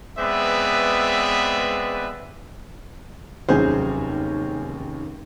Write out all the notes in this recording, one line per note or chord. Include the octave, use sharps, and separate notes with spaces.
G#3 B3 C4 B4 D5 E5
F1 D#2 F#3 C#4 G#4 C5